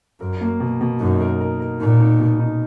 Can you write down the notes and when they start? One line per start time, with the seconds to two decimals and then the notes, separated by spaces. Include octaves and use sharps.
0.20 F#2 A#4
0.41 A#3
0.60 B2
0.81 B2
1.00 F#2 D#4
1.20 A#4
1.40 A#4
1.60 A#4
1.80 A#2 D#4
2.00 D#4
2.20 B2
2.40 D#4